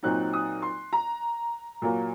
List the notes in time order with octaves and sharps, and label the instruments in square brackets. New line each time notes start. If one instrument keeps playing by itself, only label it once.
[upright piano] A#2 F#3 C4 D#4 F#6
D#6
C6
A#5
A#2 F#3 A#3